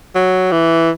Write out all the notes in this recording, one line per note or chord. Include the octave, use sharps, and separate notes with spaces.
F#3
E3